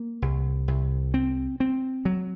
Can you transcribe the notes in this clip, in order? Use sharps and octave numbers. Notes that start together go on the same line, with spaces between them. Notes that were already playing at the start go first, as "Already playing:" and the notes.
Already playing: A#3
C2
C2
C4
C4
F#3